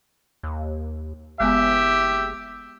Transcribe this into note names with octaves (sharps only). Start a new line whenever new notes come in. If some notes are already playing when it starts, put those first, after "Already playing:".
D#2
F#1 G#3 B3 G4 E5 G5 G#5